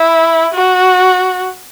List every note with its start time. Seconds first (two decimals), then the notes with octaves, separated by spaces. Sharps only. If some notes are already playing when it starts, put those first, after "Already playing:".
Already playing: E4
0.54 F#4